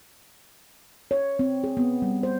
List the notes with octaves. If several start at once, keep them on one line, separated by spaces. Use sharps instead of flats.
C#5
C4
G#4
B3
G3
C5